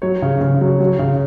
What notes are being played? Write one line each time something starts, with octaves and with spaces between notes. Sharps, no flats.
F#3 C#5
C#3
C#3
F#3
F#3
C#3